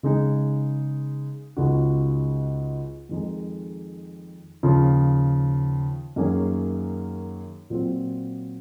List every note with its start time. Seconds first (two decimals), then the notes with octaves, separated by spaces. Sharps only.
0.03 C#3 G#3 D#4 G#4
1.57 C#2 C#3 G#3 D#4 F#4
3.09 F2 D#3 G#3 D#4 G#4
4.63 D#2 C#3 F3
6.16 F#2 D#3 A#3 C#4 G#4
7.70 A#2 F#3 C4 F4